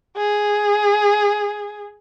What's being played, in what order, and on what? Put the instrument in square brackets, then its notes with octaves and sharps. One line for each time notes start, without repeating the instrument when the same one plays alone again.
[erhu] G#4